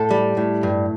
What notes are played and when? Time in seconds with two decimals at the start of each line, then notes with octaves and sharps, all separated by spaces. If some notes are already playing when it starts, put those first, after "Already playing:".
Already playing: A2 A4
0.11 G3
0.37 A2
0.63 G2